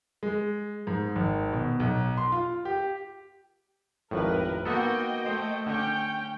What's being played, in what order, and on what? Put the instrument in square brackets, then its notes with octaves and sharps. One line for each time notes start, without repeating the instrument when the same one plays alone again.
[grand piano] G#3
G#2
G#1
B2
B1
C6
F4
G4
[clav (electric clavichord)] G#1 F2 A2 [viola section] A#4 B4
[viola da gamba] A#3 F#4 [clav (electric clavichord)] B3 D#4 A4 [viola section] D#5 G5
[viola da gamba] A3 [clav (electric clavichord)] C5
[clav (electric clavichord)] D3 [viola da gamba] C#4 [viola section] G5